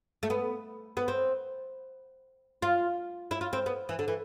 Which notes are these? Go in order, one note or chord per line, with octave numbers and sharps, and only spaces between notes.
A3
B3
B3
C4
F4
E4
F4
C4
B3
E3
D3
E3